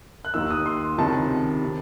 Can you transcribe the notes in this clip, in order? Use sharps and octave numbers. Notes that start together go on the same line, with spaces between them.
F#6
D#2 D#3 E6
D#6
C6
C#2 C3 D#3 A5
C3